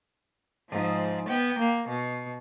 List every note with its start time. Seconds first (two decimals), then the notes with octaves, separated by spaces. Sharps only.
0.69 G#2 F3
1.28 B3 G5
1.59 A#3
1.89 B2